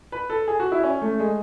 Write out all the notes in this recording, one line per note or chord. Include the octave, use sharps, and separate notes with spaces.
B4
A4
G#4
F#4
E4
C#4
A3
G#3